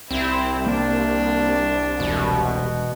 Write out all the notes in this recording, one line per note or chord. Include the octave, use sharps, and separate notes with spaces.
C2 C4 E4
A#3 D4
E1 B2